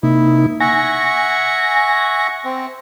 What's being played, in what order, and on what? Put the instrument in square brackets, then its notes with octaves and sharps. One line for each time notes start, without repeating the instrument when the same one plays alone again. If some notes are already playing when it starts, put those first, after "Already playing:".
[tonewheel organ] C3 A#3 D#4 [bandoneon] E4
[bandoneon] E5 F#5 C#6 [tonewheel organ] G#5 A#6
[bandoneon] C4